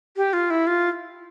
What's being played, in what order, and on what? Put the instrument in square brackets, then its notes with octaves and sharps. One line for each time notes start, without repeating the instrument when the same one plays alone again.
[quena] G4
F4
E4
F4